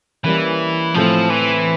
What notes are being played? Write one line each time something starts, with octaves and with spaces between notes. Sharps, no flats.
E3 G3 A#3 C#4
A2 E3 F3 A3 C4
E3